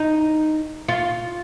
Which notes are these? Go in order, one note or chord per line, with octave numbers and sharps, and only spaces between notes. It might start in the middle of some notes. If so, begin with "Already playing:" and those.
Already playing: D#4
F4